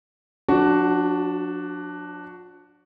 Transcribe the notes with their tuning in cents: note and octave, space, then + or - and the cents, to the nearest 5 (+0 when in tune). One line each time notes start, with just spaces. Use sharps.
F3 +45 D4 +0 F#4 +10